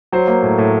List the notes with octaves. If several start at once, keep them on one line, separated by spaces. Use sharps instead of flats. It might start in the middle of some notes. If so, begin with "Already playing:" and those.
F#3 C5
A#3
A2
A2